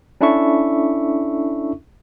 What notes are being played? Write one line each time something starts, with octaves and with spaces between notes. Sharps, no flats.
C#4 D4 E4 A4 E5 C#6